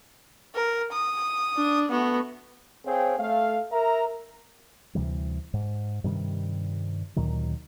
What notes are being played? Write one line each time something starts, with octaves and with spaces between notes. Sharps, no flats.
A#4
D#6
D4
A3 B3 F#4
C4 G#4 C5 C#5 F5 G5
A3 F5
A#4 E5 A#5
D2 C3 E3 G3
G#2
G2 C3 D#3 G3
D2 A#2 D#3 F#3